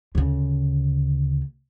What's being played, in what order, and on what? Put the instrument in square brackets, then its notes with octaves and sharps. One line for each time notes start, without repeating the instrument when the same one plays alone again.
[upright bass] D2 C#3